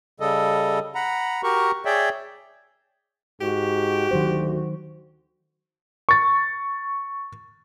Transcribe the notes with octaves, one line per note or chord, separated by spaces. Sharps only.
C#3 G3 A4 D#5
F#5 A#5 B5
F#4 G4 A#4 A#5 C#6
G#4 C#5 D5 E5 G5
G#2 F#4 G4
D2 D#3 F#3 C5
C#6 A6